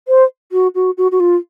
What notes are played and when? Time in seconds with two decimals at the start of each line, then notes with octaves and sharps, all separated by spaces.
0.08 C5
0.52 F#4
0.75 F#4
0.98 F#4
1.12 F#4
1.20 F4